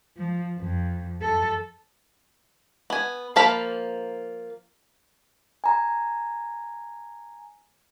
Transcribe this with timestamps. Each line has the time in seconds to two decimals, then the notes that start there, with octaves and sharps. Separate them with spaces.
0.17 F3
0.59 F2
1.22 A4
2.90 B3 G#5
3.36 F3 A#3 F5 A5 B5
5.64 G#5 A#5